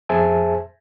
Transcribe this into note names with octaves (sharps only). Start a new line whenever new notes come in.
F2 G#4 C5 E5 G#5 A5